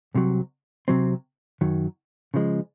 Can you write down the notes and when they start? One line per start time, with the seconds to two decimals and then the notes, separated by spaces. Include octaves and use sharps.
0.15 C2 C3 F#3
0.88 C3 F#3 C4
1.61 F#2 D#3 F#3
2.34 C#3 F3 G#3